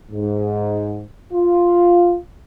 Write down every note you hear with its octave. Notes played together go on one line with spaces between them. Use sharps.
G#2
F4